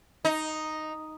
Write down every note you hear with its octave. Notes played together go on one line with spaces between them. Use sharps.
D#4